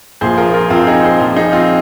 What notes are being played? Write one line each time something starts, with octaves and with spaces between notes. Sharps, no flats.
A#1 A#2 F3 G#4 C5
F4 A#4
F4 A#4
A#1 A#2 F3 C4 F4
D#4 G#4
G#4 C5
A#1 A#2 F3
D#4 G#4
C4 F4